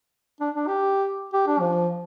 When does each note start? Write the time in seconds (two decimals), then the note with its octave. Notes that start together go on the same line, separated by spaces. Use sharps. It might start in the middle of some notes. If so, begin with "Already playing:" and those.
0.41 D4
0.55 D4
0.67 G4
1.33 G4
1.47 D4
1.60 F3